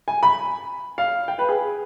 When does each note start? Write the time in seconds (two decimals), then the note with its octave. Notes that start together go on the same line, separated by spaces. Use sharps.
0.08 G#5
0.23 B5
0.98 F5
1.28 G5
1.39 B4
1.49 G#4